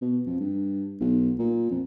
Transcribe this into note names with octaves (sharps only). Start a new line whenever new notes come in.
B2
F2
G2
B1
A#2
F2